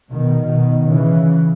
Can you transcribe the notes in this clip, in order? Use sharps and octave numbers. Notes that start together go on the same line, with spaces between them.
B2 D#3
B2 D#3
C#3 E3